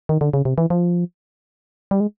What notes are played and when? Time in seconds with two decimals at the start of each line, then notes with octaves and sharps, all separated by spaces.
0.09 D#3
0.21 D3
0.33 C#3
0.45 C3
0.58 E3
0.70 F3
1.91 G3
2.00 G#3